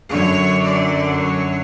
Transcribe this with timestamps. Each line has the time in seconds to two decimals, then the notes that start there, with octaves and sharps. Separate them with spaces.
0.11 F#2 D3 F#3 C#5
0.66 D5
1.22 C#5